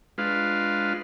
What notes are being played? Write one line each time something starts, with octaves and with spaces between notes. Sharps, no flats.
G#3 D4 F4 B4 F5